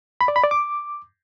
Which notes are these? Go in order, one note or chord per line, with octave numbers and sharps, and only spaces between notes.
B5
D5
B5
D5
D6